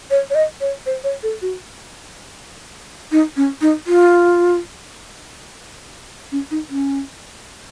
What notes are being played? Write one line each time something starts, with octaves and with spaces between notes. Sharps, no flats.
C#5
C#5
D#5
C#5
C5
C#5
A4
F#4
D#4
C#4
D#4
F4
C#4
D#4
C#4